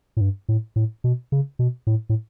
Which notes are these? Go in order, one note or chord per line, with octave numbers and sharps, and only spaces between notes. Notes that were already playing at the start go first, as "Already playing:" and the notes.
A2
G2
A2
A2
B2
C#3
B2
A2
A2